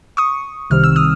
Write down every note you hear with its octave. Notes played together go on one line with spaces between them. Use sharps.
C#6 D#6
C2 C3 D#3 G3 C4 F6
E6
D#6 F6